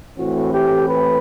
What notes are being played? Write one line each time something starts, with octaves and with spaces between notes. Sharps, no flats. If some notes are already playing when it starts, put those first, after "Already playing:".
A2 E3 A3 C4 F#4
G4
B4